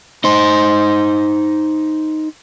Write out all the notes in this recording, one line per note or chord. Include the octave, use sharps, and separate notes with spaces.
D#4 C5